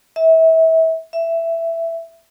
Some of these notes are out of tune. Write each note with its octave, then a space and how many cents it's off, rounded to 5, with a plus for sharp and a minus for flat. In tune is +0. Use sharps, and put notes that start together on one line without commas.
E5 -30
E5 +10